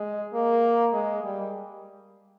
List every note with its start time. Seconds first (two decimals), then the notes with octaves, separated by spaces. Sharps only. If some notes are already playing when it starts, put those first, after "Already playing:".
Already playing: G#3
0.33 A#3
0.93 G#3
1.24 G3